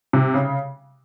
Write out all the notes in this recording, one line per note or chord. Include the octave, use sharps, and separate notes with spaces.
C3
C#3